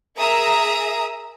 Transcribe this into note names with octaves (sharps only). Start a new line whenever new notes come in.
G#4 A#4 E5 A#5 D#6